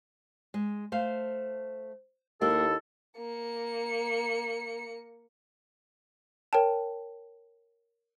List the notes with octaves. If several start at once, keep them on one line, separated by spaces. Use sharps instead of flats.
G#3
A3 C5 F5
D#2 A#3 E4 G4 A4
A#3 C#7
A#4 C#5 G5 A5